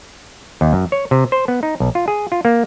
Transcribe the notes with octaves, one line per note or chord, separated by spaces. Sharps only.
D#2
F#2
C#5
C3
C5
B3
D#4
B1
F4
G#4
F4
A#3